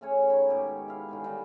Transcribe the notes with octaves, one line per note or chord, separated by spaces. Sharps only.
C#3 A3 C#4 C#5
D#3 C#5 B5 C#6
G#2 B2 G4
E4 F5
D3 D#3 G#3
D#3 G3